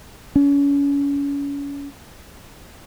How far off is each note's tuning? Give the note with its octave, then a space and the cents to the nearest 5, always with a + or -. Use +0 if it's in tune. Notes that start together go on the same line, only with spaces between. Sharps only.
C#4 +35